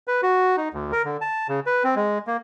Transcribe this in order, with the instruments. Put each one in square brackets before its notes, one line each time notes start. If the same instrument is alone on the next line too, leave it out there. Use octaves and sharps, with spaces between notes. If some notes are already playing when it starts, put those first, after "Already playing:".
[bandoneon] B4
F#4
D#4
D2
A#4
D3
A5
C#3
B4
C4
G#3
A#3